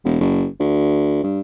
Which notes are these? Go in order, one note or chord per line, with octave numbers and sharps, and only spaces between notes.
E1
F#1
D2
G2